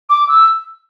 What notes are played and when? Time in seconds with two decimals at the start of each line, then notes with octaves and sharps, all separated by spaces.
0.09 D6
0.28 E6